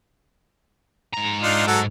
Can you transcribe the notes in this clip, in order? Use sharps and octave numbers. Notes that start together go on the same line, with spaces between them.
G#2 A#5
D4 D#4 F4
F#3 F#4 A4